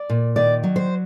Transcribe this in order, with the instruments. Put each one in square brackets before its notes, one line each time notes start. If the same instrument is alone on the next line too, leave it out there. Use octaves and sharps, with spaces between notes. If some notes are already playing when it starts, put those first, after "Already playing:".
Already playing: [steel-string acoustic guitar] D5
A#2
D#3 D5
F#3
C5